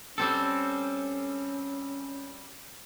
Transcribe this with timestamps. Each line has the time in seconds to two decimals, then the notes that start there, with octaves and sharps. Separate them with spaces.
0.18 G3 C4 C#4 A4